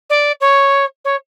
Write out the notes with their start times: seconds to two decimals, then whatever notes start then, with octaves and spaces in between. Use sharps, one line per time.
0.10 D5
0.41 C#5
1.05 C#5